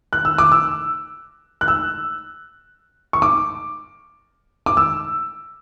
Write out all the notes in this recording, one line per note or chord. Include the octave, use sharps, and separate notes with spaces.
F#6
E6
D6
E6
F#6
E6
C#6
D6
D6
E6